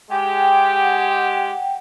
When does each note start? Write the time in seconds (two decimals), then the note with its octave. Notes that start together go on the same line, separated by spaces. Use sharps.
0.11 G#3 G4 F#5 G5